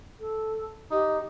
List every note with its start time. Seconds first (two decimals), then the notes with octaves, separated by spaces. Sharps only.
0.20 A4
0.91 D#4 G4